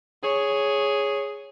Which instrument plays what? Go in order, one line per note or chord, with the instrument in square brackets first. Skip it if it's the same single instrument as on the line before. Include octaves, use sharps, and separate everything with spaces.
[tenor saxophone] G#4 [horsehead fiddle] C#5